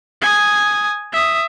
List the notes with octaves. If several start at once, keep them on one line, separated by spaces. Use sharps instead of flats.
G#5 D#6
E5 D#6